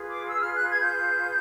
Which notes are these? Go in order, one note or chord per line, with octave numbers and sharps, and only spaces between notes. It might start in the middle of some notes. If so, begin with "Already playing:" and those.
Already playing: F4 G#4 B4
D6
E6
F6
F#6
G#6
G6